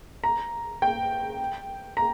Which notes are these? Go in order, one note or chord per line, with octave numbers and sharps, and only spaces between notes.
A#5
G5
A#5